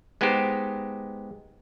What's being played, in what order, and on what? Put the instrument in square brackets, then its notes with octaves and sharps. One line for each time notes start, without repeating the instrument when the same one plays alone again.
[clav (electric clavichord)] G#3 B3 D#4 G4 C5